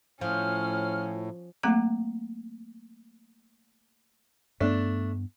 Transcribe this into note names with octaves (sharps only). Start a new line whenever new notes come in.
A2 F3 C#4 F6
F#3 A3 A#3 C4 F5 A#5
G2 A3 B3 D4